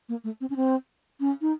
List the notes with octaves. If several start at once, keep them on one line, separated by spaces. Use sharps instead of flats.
A#3
A3
C4
C#4
C4
C#4
D#4